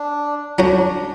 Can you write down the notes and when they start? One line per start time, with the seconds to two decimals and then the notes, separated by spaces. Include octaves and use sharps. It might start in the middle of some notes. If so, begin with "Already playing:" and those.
Already playing: D4
0.58 F#3 C#4 D4 F#4